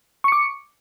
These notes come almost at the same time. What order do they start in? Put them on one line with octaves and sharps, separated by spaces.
C#6 C#7 D6